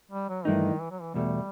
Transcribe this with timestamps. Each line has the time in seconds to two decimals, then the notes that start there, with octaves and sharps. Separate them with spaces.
0.11 G3
0.29 F#3
0.45 G2 D#3 E3 A3 D#4
0.80 E3
0.91 F#3
1.02 E3
1.14 E2 B2 G3 A3